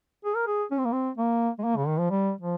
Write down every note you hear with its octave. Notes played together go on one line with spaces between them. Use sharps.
G#4
A#4
G#4
C#4
C4
A#3
C4
A#3
G#3
A#3
C#3
D#3
F3
G3
F3